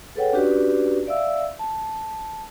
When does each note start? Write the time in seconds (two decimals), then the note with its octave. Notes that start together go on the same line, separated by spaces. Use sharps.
0.15 G#4 A4 B4 C#5 F#5 G5
0.33 C#4 D4 F#4 G4 B4 D5
1.07 D5 E5 F5 E6
1.59 A5